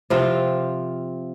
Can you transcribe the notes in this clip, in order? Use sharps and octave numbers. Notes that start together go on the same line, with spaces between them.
C3 F3 C4 F4